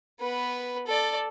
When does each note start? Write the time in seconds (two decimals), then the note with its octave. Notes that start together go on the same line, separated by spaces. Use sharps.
0.20 B3 B4
0.87 A4 D5